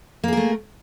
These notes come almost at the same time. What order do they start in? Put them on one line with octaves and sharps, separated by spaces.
A#3 G#4 A#4 A3